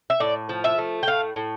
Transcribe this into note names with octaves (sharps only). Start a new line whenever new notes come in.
E5
A2 D5
F3
E5
A3
G5
A2 F5
A2